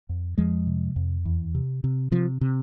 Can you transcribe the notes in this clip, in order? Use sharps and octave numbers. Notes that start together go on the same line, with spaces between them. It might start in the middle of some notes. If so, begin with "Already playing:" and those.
F2
F2 F3 G#3
C3
F2
E2
C3
C3
C3 F3
C3